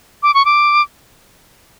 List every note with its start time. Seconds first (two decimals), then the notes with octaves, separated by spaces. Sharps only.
0.23 D6
0.34 C#6
0.45 D6